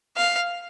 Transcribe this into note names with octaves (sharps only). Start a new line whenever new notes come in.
F5